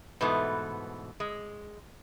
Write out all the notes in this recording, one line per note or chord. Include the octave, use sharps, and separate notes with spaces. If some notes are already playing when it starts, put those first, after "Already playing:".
G#2 B2 E3 A3 B3
G#3